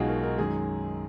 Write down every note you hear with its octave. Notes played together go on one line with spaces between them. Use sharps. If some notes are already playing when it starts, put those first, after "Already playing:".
Already playing: B1 B2 G#3 D#4 F4 F#4 G#4
A#4
A#4
F#2 D#3 G#3 G#4